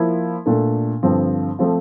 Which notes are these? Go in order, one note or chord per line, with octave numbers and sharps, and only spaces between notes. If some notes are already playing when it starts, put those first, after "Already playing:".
Already playing: F3 A#3 E4
A#2 A3 D4 A4
G2 D3 F3 C4
F3 A3 C4 F4